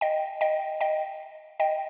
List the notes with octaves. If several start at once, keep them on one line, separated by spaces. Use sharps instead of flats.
D#5 G5
D#5 G5
D#5 G5
D#5 G5